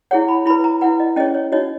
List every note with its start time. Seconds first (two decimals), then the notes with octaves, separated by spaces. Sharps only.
0.11 E4 G#4 C#5 F#5
0.28 B5
0.46 E4 B4 B5
0.64 A#5
0.81 E4 B4 F#5
1.00 D#5
1.16 C#4 G#4 C#5 D#5
1.35 C#5
1.52 D#4 F#4 C#5 D#5